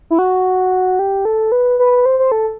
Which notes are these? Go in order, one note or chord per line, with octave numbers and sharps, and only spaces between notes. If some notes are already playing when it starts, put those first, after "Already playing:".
E4
F#4
G4
A4
B4
B4
C5
C5
A4